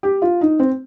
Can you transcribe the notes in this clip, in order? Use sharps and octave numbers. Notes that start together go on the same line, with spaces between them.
G4
F4
D#4
C4